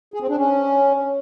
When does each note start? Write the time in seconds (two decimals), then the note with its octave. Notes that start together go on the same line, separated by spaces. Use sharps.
0.14 G#4
0.22 C4
0.29 D4
0.37 C#4